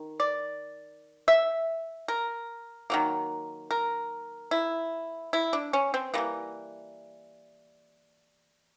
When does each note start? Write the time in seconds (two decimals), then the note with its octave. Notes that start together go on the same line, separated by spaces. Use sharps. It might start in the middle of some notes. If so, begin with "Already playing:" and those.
Already playing: D#3
0.20 D5
1.28 E5
2.08 A#4
2.90 D#3 F#3 A#3
3.71 A#4
4.51 E4
5.33 E4
5.53 D4
5.73 C#4
5.94 C4
6.14 E3 G3 A#3 B3